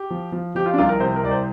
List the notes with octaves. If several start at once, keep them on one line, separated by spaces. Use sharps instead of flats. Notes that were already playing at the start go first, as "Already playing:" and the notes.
Already playing: G4
F3
F3
F3 G4
F4
D4
C2 F4
A#4
C3 C5
A#4
C2 D5
C5